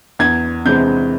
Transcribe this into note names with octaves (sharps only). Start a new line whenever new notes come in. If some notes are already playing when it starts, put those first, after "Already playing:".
E2 G#6
C3 E3 G#3 C4 G6